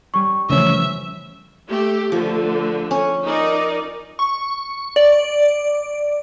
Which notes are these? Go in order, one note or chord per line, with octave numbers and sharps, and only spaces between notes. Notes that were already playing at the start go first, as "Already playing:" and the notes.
G3 C#4 C#6
C#3 E3 F3 A3 C#4 E5
A3 G4
D3 F3 A3
C#4
D#4 A#4 D5
C#6
D5